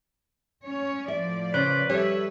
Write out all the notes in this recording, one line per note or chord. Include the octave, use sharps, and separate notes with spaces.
C#4 C#5
A2 F3 D5 E5
C#3 B4 C5
G3 A4 C#5 E5